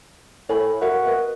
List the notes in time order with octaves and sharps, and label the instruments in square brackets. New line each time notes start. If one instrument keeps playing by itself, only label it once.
[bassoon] A2 [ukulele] C#5 G#5 B5
[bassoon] F#4 [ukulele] A#4 E5 F5
[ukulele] A#4 B4 D#5